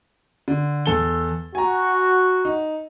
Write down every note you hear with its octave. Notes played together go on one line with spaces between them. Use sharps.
D3
E2 A4 G7
F#4 G#5 A#5
D#4